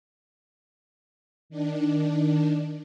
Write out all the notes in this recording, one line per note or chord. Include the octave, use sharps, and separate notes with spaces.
D#3 D4